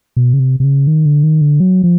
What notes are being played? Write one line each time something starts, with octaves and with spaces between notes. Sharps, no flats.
B2
C#3
C3
C3
C#3
D#3
D3
D#3
D3
F#3
F3